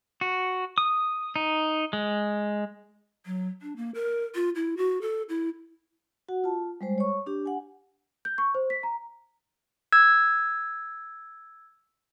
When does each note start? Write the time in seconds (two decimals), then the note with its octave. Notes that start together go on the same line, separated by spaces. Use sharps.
0.21 F#4
0.78 D#6
1.36 D#4
1.93 G#3
3.26 F#3
3.62 D4
3.76 A#3
3.94 A#4
4.35 F4
4.55 E4
4.77 F#4
5.01 A4
5.29 E4
6.29 F#4 F#5
6.44 F4 A5
6.81 G3 G#3 C5
6.98 C#5 C#6
7.26 D4 G4
7.46 F#5 G#5
8.25 G6
8.38 C#6
8.55 C5
8.70 B6
8.83 A#5
9.92 E6 G#6